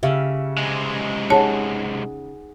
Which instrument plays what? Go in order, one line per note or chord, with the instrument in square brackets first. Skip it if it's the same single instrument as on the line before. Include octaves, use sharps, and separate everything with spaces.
[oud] C#3 [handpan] G4 E5 F5
[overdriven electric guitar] C3 G#3
[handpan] D#4 G#4 F#5 [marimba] C#5 A5